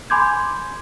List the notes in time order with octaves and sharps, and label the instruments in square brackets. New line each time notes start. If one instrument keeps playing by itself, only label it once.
[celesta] G#5 B5 C6 D6 G6 G#6